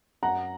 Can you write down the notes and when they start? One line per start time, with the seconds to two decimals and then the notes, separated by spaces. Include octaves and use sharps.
0.23 F#2 F#5 A#5